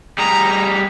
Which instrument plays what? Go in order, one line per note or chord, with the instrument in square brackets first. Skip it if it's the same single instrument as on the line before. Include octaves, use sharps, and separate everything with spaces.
[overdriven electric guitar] G3 G#4 [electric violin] A#5